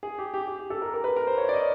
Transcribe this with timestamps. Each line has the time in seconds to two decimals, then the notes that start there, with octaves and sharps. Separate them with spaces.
0.03 G#4
0.19 G4
0.34 G4
0.48 G4
0.59 G4
0.70 A4
0.82 A#4
0.94 A#4
1.04 B4
1.16 A#4
1.27 C5
1.38 C#5
1.49 D5
1.53 D#5